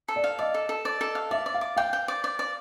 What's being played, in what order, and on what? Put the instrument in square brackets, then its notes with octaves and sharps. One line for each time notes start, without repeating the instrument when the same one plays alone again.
[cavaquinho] A4
[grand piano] D5
[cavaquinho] F5
[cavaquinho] D5 [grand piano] D#5
[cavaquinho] A4
A4
D5
A4
F5
[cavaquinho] D5 [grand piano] E5
[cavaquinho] D5
[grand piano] F5
[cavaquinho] D5
[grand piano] F5 [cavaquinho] G5
[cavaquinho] G5
D5
D5
D5